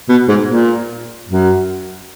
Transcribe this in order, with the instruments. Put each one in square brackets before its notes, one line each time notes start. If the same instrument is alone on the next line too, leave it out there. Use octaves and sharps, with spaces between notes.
[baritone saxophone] B2
G#2
A#2
F#2